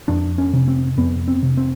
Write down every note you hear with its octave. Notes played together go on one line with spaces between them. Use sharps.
F2 D4
C#4
C3
C4
F2 B3
C4
C3
C4